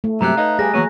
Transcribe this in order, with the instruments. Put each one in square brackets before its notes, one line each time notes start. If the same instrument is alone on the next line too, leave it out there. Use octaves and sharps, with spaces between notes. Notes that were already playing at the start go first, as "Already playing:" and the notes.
[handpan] A3
[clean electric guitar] G2 F#3 A#3 [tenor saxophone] C3 [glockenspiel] A#5 F#6
[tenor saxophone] D#4 [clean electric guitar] B4 C#5 F5
[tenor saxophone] G3 [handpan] G#4 [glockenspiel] A#6
[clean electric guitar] E3 A#3 B3 [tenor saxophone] F#3